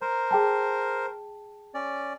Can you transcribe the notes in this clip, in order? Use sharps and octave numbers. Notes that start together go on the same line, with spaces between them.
A#4 C5 A#5
G#4 G5 A5
C#4 D5